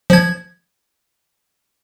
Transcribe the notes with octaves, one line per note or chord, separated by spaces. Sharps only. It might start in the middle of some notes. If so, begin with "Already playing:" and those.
F3 G#6